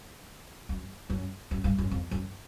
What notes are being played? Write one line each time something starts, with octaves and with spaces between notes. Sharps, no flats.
F#2
F#2
F#2
G2
F#2
F2
F#2